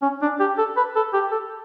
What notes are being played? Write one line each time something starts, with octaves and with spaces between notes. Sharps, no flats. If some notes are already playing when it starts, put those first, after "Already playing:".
C#4
D4
G4
A4
B4
A4
G4
A4